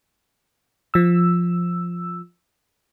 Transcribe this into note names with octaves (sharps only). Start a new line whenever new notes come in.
F3 E6